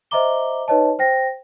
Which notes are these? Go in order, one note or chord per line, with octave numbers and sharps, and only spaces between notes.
C5 D#5 E5 A#5 D6 G7
D#4 B4 C#5 D#5 A5
C5 G5 A#6